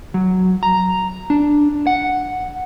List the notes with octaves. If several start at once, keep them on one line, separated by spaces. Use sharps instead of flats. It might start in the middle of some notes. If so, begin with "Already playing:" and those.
F#3
A#5
D4
F#5